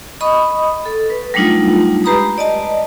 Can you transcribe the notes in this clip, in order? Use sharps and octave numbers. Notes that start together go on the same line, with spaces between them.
D#5 B5 C#6 D#6
A4
B4
F#3 G3 A3 D4 D#4 F4
G#3 G4 B4 A#5 B5 D#6
D5 D#5 A5